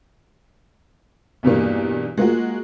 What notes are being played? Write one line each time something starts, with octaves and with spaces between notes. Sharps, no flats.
B1 E2 G2 A#3
G#3 A#3 F4 F#4